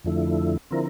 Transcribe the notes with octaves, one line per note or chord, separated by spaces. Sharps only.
F2 D3 F3 A3 E4
D3 F3 C4 E4 A#4